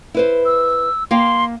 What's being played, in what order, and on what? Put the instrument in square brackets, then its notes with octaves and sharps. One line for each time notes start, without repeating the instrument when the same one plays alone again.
[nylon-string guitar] E4 B4 C5
[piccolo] E6
[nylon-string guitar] A#3 F5 G5 [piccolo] C6